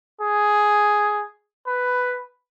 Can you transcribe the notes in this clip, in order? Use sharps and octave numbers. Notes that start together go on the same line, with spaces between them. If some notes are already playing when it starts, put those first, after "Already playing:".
G#4
B4